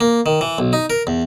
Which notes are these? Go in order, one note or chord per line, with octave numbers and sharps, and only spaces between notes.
A#3
D#3
E3
B1
D#4
A#4
E2